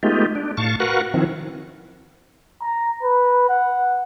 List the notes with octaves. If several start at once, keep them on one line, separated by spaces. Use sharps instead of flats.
G#3 A3 B3 D#4 F4 G4
D4
A2 F5 A5 C#6
F#4 A#4 B4 F5 F#5 C#6
D#3 F3 C4 E4
A#5
B4
F#5